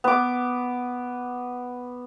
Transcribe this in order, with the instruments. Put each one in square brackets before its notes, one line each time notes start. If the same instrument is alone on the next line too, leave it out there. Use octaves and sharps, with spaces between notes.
[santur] B3 D6